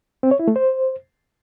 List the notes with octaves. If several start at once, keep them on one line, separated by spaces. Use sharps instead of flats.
C4
C#5
E4
A3
C5